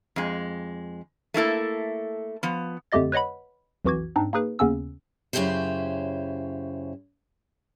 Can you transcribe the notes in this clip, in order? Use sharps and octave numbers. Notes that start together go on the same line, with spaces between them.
F2 G#3
A3 A#3 E4 A4
F3 B3
F2 D3 A3 G4 D#5 A6
B4 C#5 D#5 F#5 B5
B1 F2 E3 F#4 D6 G#6
G#2 C4 D4 D#4
A#3 D#4 G#4 B4
D#2 C#3 B3 C#4 E6
F#2 C#3 E3 E4 G4 C5